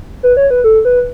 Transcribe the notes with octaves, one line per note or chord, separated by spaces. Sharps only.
B4
C#5
B4
A4
B4